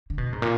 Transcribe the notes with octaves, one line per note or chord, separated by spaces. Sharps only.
D3
B2
G#2
A#2